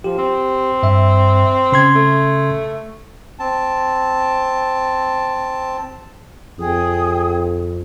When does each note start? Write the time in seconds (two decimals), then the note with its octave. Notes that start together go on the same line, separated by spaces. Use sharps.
0.04 F3 G4
0.18 C4
0.83 G2 E5
1.72 C#3 C6 G#6
1.95 A3
3.39 C4 A5
6.59 F2 G#4 G5 D#6